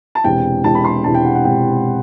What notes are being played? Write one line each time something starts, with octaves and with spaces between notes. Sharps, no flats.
A5
E1 E2 C3 G5
E1 E2 C3 A5
B5
C6
E1 E2 C3 A5
G5
F#5
F#5
E1 E2 C3 G5